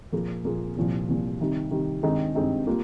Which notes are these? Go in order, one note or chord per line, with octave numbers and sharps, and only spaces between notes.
A#2 F3 A#3 F4 G#4
A#2 F3 A#3 F4 G#4
C2 A#2 F3
C2 A#2 F3
C3 D#3 G3
C3 D#3 G3
G2 D#3 G#3 C4 D#4
G2 D#3 G#3 C4 D#4
G3 A#3 F4